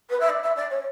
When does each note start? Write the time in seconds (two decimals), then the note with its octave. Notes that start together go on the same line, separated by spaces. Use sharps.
0.10 B4
0.20 E5
0.29 D5
0.42 E5
0.56 D5
0.70 C#5